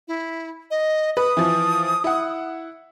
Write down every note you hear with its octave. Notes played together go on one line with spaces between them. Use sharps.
E4
D#5
B4 D#6
E3 F3
E4 F#5